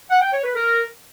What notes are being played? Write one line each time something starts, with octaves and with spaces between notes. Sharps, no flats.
F#5
G5
C#5
B4
A#4